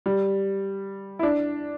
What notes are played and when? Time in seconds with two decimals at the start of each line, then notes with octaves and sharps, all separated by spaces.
0.06 G3
1.19 E4
1.23 D4